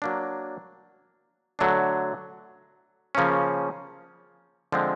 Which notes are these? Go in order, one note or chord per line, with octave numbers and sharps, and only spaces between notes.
F#3 A#3 D4
D3 F#3 A3 D4
C#3 F3 A#3 C#4
D3 F3 G#3 C4